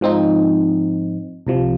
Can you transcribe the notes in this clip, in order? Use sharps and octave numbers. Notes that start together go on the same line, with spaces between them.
G#2 F3 C4 D#4
C2 C3 F3